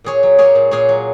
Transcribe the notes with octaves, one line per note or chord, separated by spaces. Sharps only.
A#2 G#4 C#5
F#3
A#3 G#4 C#5
A#2
A#2 G#4 C#5
F#3